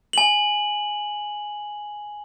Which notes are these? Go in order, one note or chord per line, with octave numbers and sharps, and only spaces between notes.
G#5 F#7